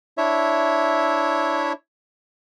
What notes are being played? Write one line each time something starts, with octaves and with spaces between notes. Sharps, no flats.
D4 E4 C#5 E5